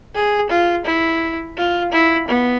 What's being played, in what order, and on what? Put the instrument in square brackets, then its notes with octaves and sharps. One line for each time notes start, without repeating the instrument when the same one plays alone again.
[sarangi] G#4
F4
E4
F4
E4
B3